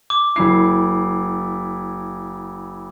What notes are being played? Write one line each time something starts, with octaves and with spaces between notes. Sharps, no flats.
D6
F#1 E4 C7